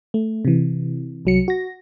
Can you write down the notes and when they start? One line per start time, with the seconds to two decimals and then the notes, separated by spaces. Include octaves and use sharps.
0.14 A3
0.45 C3 E3
1.25 C2 F#3 C#7
1.48 F#4 A#6